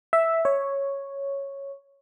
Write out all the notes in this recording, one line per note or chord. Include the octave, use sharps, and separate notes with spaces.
E5
C#5